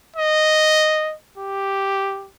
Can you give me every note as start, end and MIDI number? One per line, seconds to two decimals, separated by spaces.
0.16 1.14 75
1.38 2.29 67